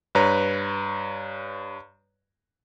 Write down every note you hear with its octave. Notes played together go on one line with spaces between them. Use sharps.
G2 B4 C#5 A#5